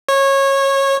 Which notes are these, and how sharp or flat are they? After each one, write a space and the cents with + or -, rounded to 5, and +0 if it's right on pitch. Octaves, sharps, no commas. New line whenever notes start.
C#5 -20